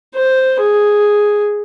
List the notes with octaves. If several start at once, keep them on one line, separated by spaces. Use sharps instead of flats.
C5
G#4